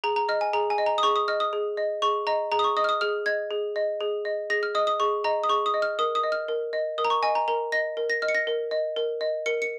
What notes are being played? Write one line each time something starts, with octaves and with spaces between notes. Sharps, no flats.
G#4 A#5
A#5
D#5 F6
G#5
G#4 A#5
G#5
D#5
A#5
D#6
G#4 C#6
D#6
D#5 F6
D#6
G#4
D#5
G#4 C#6
D#5 A#5
G#4 A#5
D#6
C#6
D#5 D#6
F6
D#6
G#4 F6
D#5 G#6
G#4
D#5
G#4
D#5
G#4 A#6
F6
D#5 D#6
D#6
G#4 C#6
D#5 A#5
D#6
G#4 C#6
D#6
D#5
F6
A#4 D#6
D#6
D#5
F6
A#4
D#5
A#4 D#6
A#5
C#6
D#5 G#5
A#5
A#4 A#5
D#5 A#6
A#4
A#6
D#5 F6
C#7
A#6
A#4
D#5
A#4
D#5
A#4 C#7
C#7